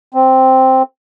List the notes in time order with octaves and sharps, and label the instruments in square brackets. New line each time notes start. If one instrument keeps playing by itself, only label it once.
[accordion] C4